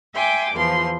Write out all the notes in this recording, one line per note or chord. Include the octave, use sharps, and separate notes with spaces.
E5 G5 G#5 C6 D6
E2 E3 F3 C6